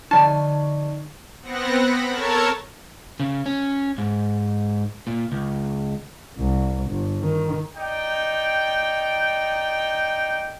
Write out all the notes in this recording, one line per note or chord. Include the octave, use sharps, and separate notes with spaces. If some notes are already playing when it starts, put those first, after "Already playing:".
D3 F3 D#4 D5 A5 C#6
B3 C4 F#5 A#6
B5
A4 A#4 C#5 A5 G#6
C#3
C#4
G#2
A#2
C#2
C2
G1
D#3
D#4 D5 G5